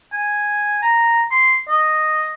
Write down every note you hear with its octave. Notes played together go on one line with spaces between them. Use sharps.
G#5
A#5
C6
D#5